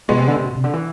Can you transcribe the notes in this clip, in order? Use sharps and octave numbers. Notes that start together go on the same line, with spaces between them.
B2 G#3 B3
C3
D3
C3
B2
C3
D3
E3